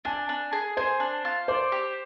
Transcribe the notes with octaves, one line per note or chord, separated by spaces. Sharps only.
D4 G#5
D4
G#4
G#4 C5
D4
F4
C5 D5
G4